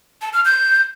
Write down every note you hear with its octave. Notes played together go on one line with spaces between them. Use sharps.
A5
F6
G6